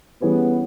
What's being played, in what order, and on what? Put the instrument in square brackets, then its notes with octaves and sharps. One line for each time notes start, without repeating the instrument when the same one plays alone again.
[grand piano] E3 G3 C#4 G#4 B4 [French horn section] B3